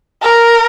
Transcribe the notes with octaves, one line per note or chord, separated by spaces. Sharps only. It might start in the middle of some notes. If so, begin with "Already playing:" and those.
A#4